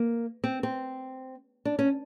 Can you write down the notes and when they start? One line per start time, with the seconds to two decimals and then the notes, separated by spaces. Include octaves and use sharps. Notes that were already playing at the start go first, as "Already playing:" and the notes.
Already playing: A#3
0.44 C4
0.63 C4
1.65 D4
1.79 C#4